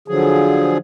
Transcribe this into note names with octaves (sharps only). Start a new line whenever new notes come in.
D3 F3 F#3 G#4